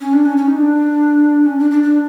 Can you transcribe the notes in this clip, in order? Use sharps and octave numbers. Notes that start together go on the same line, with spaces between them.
C#4
D4
C#4
C#4
D#4
D4
C#4
D4
D4
D4